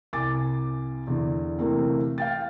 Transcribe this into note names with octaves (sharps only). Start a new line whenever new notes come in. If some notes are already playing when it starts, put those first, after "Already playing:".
C2 G#5 D6 A6
E2 D3
C3 E3 A3 A#3 C4
F5 G5 A6